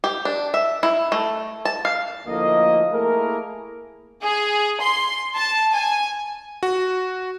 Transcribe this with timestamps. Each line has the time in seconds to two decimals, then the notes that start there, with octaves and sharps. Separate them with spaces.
0.04 G4
0.25 D4
0.54 E5
0.83 E4
1.12 A3
1.65 A5
1.85 F5
2.27 D2 F3 A3 A#3 E4 D#5
2.91 A3 A#3 E4 G#4 A#4
4.24 G#4
4.80 C6
5.36 A5
5.74 G#5
6.63 F#4